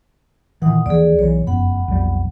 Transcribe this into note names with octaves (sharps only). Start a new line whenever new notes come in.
A#2 D#3 E3 F#5 D#6
D#2 E3 F3 G#4 D5
B1 E3 C#5
F1 F#2 B3 F#5 B5
B1 F2 G3